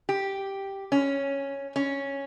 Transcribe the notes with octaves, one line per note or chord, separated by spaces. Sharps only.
G4
C#4
C#4